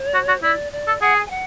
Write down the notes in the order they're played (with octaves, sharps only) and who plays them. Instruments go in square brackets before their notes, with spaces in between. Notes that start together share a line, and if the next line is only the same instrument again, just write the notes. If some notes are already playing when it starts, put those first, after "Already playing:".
Already playing: [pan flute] C#5
[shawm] F#4
F#4
[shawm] E4 [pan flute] D5
[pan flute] D5
[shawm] A4
[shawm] G#4 [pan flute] F#5
[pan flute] G#5
G#5
F#5